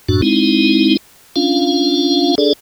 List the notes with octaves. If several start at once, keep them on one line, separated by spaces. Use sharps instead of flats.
F#2 A2 D4 F#4
G#3 C4 D#4 E4
C#4 D4 F4 F5
D4 G#4 A4 D5